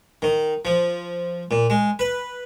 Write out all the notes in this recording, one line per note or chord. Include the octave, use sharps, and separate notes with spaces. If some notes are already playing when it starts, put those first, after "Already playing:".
D#3
F3
A#2
G#3
B4